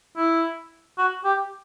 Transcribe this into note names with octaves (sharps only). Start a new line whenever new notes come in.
E4
F#4
G4